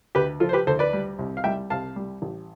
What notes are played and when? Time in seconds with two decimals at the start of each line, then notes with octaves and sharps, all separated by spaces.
0.15 D2 G4 B4
0.40 F3 F4 A4
0.49 C5
0.53 G4 B4
0.67 D2 A4 C5
0.79 B4 D5
0.93 G3
1.19 C2
1.37 F5
1.44 G3 E5 G5
1.70 C2 F5 A5
1.96 G3
2.22 A1